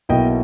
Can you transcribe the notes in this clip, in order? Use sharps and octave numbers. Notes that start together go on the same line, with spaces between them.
B1 B2 A#3 E4 D#5 G5